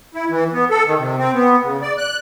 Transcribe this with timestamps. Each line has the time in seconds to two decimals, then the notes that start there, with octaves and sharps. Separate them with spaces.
0.14 E4
0.30 E3
0.53 B3
0.70 A4
0.86 D#3
0.98 C3
1.18 C4
1.34 B3
1.63 C#3
1.82 D5
1.98 F#6